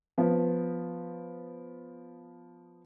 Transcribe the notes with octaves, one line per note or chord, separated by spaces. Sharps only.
F3 B3